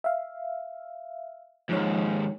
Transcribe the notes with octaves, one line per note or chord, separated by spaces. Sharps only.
E5 F5
D#2 G#2 F3 C#5